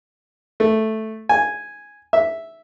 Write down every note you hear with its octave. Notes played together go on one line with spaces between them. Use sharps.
A3
G#5
E5